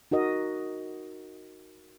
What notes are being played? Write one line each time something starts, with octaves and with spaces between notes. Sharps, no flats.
D#4 F#4 A#4 D#5